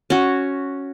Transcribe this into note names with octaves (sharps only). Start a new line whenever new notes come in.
C#4 F#4